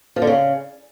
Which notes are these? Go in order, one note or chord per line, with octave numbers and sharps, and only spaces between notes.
F3
D3
C#3